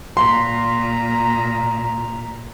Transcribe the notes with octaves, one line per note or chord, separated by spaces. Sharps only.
A#2 A#5 C6